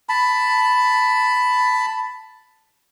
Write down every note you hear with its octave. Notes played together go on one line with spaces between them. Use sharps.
A5 B5